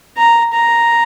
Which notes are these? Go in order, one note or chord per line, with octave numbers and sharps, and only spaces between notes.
A#5
A#5